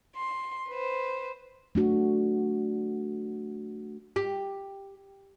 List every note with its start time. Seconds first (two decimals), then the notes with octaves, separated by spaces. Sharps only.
0.16 C6
0.68 B4 C5
1.75 A3 D4 F#4
4.16 G4